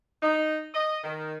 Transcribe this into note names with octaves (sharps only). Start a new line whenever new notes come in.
D#4
D#5
D#3